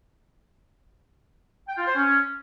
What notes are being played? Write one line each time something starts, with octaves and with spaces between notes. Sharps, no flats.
G5
F4
C5
C#4